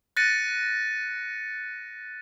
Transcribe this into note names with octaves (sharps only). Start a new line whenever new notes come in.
F#6 A6 A#6 C#7 D#7